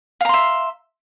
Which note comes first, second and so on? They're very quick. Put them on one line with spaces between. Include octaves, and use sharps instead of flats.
F5 A#5 C6 E5